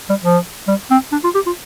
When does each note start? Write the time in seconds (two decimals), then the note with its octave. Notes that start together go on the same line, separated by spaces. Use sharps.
0.09 G3
0.24 F3
0.68 G3
0.91 C4
1.12 D4
1.24 F4
1.34 G4
1.46 F4